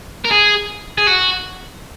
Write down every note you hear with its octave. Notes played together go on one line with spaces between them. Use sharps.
A#4
G#4
G#4
F#4